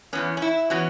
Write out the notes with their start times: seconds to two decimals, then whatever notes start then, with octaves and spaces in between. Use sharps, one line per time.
0.13 E2 E3 B3 C#4
0.37 C#4
0.42 E4
0.70 E3 B3 C#4 F#4